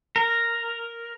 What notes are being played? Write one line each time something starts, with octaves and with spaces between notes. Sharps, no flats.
A#4